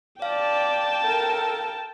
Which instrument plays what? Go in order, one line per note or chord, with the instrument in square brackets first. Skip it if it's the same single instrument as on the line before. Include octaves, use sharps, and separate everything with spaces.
[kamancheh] D5 [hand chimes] F5 [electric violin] G5 A5
[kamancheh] A4 A#4